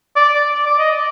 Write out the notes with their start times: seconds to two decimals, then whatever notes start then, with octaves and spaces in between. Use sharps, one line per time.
0.16 D5
0.36 D5
0.54 D5
0.66 D5
0.79 D#5
0.92 D5